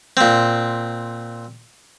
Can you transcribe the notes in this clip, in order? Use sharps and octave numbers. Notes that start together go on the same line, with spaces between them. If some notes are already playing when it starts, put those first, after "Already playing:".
A#2 C4